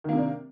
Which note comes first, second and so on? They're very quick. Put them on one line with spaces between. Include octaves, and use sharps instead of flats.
D#3 A#3 C3 D4